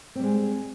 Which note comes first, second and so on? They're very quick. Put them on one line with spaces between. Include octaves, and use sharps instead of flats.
C4 G3 G#3